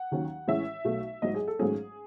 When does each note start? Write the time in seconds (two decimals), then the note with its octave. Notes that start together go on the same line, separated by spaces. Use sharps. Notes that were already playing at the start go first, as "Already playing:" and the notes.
Already playing: F#5
0.11 D#2 D#3 F#3 C#4
0.47 A1 A2 E3 G#3 C#4 E5
0.85 B1 B2 A3
1.22 A1 G#2 F#3 D#5
1.35 G#4
1.48 A4
1.59 G#1 G#2 F#3 A3 C#4 G#4